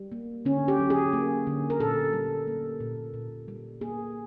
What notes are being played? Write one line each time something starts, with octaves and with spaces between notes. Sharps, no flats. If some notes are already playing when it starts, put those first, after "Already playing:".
Already playing: G3
A#3
D3 C#4
G4
F#3
G#4
A#3
D3
A#4
A#2 A4
G3
A#3
A#2
A#2
G3
A#3 G#4